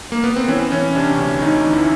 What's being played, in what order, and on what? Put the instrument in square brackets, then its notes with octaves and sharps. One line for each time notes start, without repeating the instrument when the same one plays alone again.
[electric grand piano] A#3
B3
C4
E3 C#4
E3 C#4
C3 D4
D2
D2 D#4
E3
E4